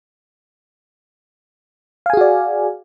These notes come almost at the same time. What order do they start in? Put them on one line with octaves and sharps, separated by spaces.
F5 G#5 G#4 F#4 D5